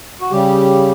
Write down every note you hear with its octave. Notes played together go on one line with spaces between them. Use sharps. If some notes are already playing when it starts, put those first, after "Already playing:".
F#4
C#3 G3 G4